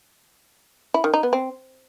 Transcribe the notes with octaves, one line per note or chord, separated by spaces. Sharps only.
E4
D#3
D#4
B3
C4